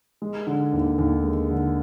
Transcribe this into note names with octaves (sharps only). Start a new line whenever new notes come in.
G#3
D3
D#2
D#2
G#3
D3